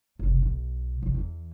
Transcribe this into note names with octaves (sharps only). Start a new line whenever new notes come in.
F#1 C2
B1
G1 C2
E2 E3